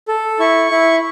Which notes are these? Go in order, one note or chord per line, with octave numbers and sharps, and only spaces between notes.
A4
E4 C#6
E4